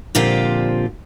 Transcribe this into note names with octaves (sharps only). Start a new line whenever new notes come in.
A#2 D3 F3 C4 F4 G4